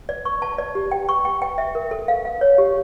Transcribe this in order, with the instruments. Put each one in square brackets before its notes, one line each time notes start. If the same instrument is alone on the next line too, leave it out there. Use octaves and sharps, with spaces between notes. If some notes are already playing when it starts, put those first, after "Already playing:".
[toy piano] D5
C#6
A5
D5
G4
G5
C#6
G5
G5
E5
A#4
A4
F5
F5
C#5
G4